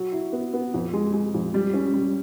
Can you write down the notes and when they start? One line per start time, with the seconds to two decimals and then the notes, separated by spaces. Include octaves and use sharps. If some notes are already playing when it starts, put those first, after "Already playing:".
Already playing: F#3
0.12 E4
0.33 B3
0.54 B3
0.74 F2
0.93 G#3
1.13 G#3
1.34 F2
1.54 G3
1.74 C#4
1.94 G3